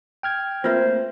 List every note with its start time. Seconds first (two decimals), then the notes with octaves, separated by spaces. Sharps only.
0.23 G5 F6 G#6
0.64 A3 A#3 C4 F4 B4 C5 E5